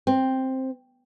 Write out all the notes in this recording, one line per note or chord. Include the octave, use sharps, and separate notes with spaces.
C4